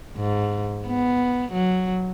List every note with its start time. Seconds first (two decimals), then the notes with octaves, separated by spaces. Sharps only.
0.17 G#2
0.87 B3
1.53 F#3